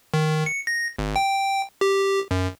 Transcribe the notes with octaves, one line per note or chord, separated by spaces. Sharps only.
D#3
C#7
A#6
G#1
G5
G4
F#2